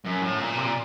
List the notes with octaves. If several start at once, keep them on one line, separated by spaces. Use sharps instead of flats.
F#2
A2
A#2
C3
A#2